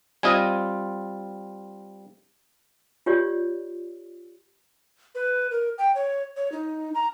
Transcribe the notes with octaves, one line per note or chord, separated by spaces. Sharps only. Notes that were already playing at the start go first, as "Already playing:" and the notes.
G3 C4 F4 D#5 G#5
F4 G4 C#5 D5
B4
A#4
G5
C#5
C#5
D#4
A#5